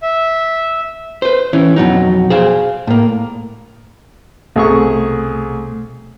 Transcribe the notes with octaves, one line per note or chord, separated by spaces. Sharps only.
E5
B4 C5
E3 C#4
F2 B2 F#3 D#4
G#4 C5 F5
A2 A#3
C2 B2 A3 G#4 C#6